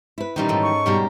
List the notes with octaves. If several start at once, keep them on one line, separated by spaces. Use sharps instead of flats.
E4 B4
A#2 D#3 E3 G3 C#4 D#4
G#2 A4
C#6
G#2 B2 G3 G4 A#4